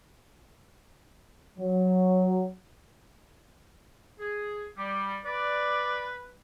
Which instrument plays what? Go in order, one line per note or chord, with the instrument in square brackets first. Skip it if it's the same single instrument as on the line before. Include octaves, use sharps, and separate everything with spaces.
[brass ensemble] F#3
[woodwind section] G#4
G3
[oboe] B4 [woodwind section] D5